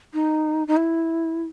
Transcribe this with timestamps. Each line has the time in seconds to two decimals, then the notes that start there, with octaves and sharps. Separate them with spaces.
0.14 D#4
0.68 D#4
0.77 E4